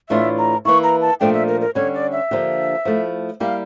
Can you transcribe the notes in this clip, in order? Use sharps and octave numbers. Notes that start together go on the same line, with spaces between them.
A2 E3 A3 D4 F4 E5
A#5
E3 A#3 E4 C#6
A#5
A5
A#2 F3 A3 D4 G5
E5
A#4
A#4
D3 G3 C#4 C#5
D5
E5
D3 F3 A#3 D4 G4
F3 A3 E4
G3 A#3 E4 G4 F5